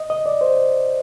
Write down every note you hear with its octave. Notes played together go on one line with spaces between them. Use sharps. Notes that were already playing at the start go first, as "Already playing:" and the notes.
Already playing: D#5
D#5
D5
C5